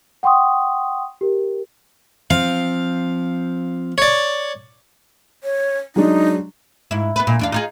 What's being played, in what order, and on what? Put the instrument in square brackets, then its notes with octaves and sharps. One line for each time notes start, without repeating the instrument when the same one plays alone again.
[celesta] F#5 G5 C6 C#6 D#6
G4 A#4
[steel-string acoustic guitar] F3 C4 [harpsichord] F5
[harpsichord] C#5 D5
[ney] C#5
[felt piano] F#3 G#3 D4 [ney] D#4
[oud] G#2 E4
B3 B4
A#2
E2 D4 F5
D#4 F4 G#4